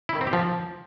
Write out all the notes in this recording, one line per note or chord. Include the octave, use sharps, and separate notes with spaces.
E4
D#3
C4
G4
F3